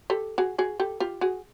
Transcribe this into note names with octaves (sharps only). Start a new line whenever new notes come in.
G4 A4
F#4 G#4
F#4 G#4
G4 A4
F4 G4
F#4 G#4